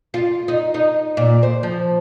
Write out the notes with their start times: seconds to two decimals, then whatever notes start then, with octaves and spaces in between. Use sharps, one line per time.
0.14 F4
0.48 D#4
0.74 D#4
1.17 A#2
1.43 C5
1.63 F3